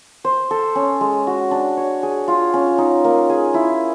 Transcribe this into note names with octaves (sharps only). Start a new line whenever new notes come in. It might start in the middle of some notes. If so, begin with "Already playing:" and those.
C5
A4
C#4
G#3
F#4
D4
C#5
G#4
F4
C#4
D#4
A#3
G#4
E4